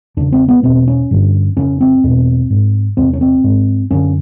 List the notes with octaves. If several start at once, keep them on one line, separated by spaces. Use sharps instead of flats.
E2 C#3 D4
C4
B3
E2 B2 C4
C#4
G2 D3
F2 C#3 C#4
C4
E2 B2
G#2
E2 C3 C4
C#4
C4
G#2
F#2 D3 C#4